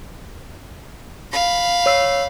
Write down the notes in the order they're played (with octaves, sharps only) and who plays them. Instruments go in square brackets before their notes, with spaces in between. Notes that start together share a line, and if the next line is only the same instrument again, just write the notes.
[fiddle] F5 B5
[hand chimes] C#5 E6 C7